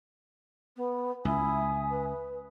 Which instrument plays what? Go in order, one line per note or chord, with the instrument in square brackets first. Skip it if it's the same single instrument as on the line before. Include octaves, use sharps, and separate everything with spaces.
[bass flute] B3
[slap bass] C#2 [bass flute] E4 [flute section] E5 G#5 D#6
[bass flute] B4